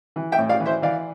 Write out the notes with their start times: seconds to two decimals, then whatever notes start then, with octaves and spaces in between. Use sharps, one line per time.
0.16 E3
0.32 E5 G5
0.38 A2
0.49 D5 F5
0.60 E3
0.65 C5 E5
0.82 E3 D5 F5